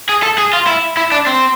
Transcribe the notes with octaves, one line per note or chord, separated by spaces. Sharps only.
G#4
A4
G#4
F4
E4
E4
D4
C4